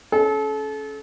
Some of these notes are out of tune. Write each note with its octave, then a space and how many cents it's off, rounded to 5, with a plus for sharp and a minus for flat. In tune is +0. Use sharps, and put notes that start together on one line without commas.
C#4 +0 A4 -35